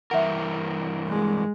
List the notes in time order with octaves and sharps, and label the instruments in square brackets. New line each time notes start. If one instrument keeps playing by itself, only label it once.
[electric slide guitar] G2 E3 A#4 [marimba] E5 F#5
[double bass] G#3